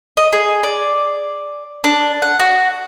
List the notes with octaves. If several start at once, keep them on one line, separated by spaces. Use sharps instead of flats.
D#5
G#4
D5
D4
F#5
F#4